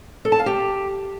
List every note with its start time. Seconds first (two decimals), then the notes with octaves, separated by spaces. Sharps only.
0.25 A4
0.32 A5
0.39 F5
0.46 G4